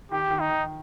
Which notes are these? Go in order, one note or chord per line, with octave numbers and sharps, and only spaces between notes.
D#3 G4
D#3
D#4
D#3